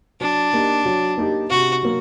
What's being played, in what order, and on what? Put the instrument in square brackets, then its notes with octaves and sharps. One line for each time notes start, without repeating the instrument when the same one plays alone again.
[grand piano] F#3 [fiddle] D4
[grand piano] A#3 D#4 G4
F#3
A#3 D#4 G4
[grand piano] C3 [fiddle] F#4
[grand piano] F#3 A#3